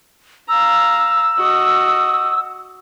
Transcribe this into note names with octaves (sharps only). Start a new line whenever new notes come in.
F5 A#5 E6
F#4 D#5